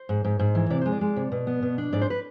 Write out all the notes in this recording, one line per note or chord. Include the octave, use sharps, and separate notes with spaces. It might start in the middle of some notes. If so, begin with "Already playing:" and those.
Already playing: C5
G#2
G#2
G#2
E3
C3 D5
G#3 C5
D5
G#3
C3
B2
B3
B2
D4
G#2 D5
C5
B4